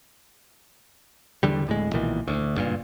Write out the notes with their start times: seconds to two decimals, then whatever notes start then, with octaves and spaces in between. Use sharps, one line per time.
1.43 E2 D3 G3
1.67 D1 A2 G#3
1.93 B1 A#2 D#3 E3
2.28 D2
2.55 F#1 G2 A#2